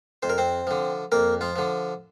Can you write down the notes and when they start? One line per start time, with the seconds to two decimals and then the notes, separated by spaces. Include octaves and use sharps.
0.23 F2 C5
0.30 A#4
0.38 C4 C5
0.67 D3 F3
1.12 F2 A#3 A#4
1.41 F3 F4
1.56 D3 F3